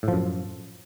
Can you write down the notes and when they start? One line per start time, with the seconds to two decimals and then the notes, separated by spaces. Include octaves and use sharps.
0.03 A2
0.08 F3
0.13 F#2